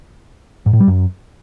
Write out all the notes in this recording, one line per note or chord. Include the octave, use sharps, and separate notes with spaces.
G#2
A2
G3
F#2